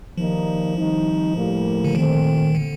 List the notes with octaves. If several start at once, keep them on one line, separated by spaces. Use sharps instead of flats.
D#3 F3 G3 A#3 D#4
D#3 G3 C4 D#4
A2 G3 A#3
D3
A#2 D#3 A3 C4
D3